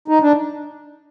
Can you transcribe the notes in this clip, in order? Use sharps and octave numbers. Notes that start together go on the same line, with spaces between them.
D#4
D4